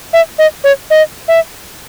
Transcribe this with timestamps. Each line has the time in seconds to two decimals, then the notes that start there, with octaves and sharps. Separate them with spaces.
0.13 E5
0.38 D#5
0.64 C#5
0.90 D#5
1.28 E5